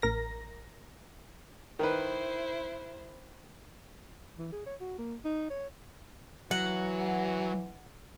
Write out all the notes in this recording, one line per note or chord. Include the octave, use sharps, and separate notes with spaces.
A1 A#4 A#6
D#3 E4 B4 C5
E3
G#4
C#5
F#4
A#3
D#4
C#5
E3 F#3 F#5